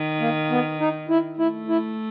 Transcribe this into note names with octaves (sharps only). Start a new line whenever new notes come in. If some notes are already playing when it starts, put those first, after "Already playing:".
Already playing: D#3
A#3
B3
D#4
E4
A3 E4
E4